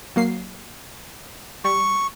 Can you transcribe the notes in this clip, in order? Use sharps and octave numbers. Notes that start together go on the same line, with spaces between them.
F#3 A#3 C7
G3 C#6